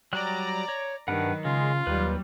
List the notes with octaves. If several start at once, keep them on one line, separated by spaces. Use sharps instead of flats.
F#3 G3 D5 A#5 F#6
C#5
G2 D#3 F#3 D4 A#4 B4 F#5
C#3 G#3 F4
D#2 F#3 G3 B4